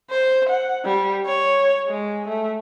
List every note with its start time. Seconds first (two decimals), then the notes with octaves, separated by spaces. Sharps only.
0.10 C5
0.49 F#5
0.85 G3
1.26 C#5
1.87 G#3
2.28 A3